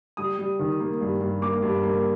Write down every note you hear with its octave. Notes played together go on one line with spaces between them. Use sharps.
G3 D#6
G3
D#3
A#3
G2
G2
A#3 D6
G2
A#3